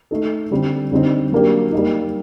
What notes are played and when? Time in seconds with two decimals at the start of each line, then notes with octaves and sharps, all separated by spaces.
0.11 A3 D#4 A4
0.51 D3 G3 C4
0.92 D3 G3 C4 D#4
1.32 F#3 A#3 D4 G4
1.73 G3 A#3 D#4